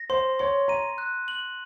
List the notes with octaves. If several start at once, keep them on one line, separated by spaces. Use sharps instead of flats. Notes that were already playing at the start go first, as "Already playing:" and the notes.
Already playing: A#6
C5 C6
C#5 C6
A#5 D#7
F#6
F#7